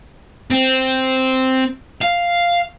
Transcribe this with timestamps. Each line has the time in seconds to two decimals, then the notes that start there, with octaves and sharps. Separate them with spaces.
0.50 C4
2.02 F5